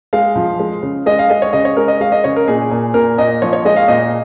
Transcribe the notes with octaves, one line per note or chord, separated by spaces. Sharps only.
G#3 F5
F3
G#3
C#3
G#3 D#5
F5
G#3 D#5
C#5
C#3 D#5
C#5
G#3 A#4
D#5
G#3 F5
D#5
C#3 C#5
A#4
A#2 G#4
A#2
A#2 A#4
A#2 D#5
F3 C#5
C#5
G#3 D#5
F5
A#2 D#5